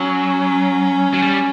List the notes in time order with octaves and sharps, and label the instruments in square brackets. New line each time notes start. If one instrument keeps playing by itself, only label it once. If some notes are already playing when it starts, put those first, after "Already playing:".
Already playing: [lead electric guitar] F#3 [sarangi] C#4
[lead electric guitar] F#3
G3